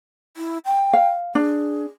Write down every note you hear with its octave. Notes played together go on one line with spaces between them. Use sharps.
E4
G5
F5
D4 G#4